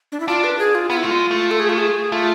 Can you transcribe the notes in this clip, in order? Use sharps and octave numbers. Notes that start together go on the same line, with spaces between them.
D4
E4
D4 F4
B4
G#4
F4
B3 F4
E4
A3 F4
G#3
A3
A4
G#4
F4
G#4
A3 F4